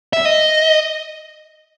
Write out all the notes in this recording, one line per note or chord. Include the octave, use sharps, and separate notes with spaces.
E5
D#5